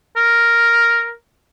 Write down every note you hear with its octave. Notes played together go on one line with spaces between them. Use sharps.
A#4